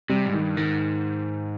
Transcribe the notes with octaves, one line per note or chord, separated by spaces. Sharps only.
C3 G3
G#2
D#3
G2
G#2 D#3